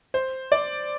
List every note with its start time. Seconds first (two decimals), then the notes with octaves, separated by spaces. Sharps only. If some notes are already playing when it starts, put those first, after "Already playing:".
0.14 C5
0.52 D5